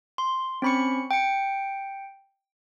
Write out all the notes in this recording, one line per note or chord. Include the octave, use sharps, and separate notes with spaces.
C6
C4 C#4 B5 C#6 C#7
G5 C#7